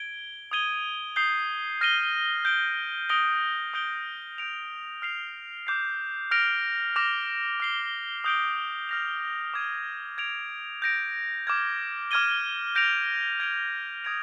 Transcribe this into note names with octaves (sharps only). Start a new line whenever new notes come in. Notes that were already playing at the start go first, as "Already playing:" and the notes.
Already playing: G#6 D7 G7
D#6 G#6 D#7 G7
D#6 G6 C7 G7
F6 A#6 D#7 G7
G6 D7 G7
D#6 A#6 D7 G7
D#6 G6 D7 G7
G6 D7 F7
F6 C7 F7
D6 G6 C7
F6 A#6 D7 F7
D6 F6 A#6 F7
F6 C7 G7
D#6 G6 D7 G7
F6 A#6 F7
D6 G#6 D#7
G#6 D7 F7
G6 A#6 D7
D6 F6 G#6
D6 F6 G#6 D#7 G7
G6 A#6 D7 F7
G#6 D7 F7
D#6 G#6 D7 F7